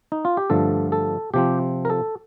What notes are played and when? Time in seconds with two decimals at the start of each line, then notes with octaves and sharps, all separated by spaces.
0.12 D#4
0.25 F4
0.37 G4
0.50 G2 D3 F3 A3 A4
0.92 A4
1.34 C3 F3 C4 G4
1.85 A#4
1.90 A4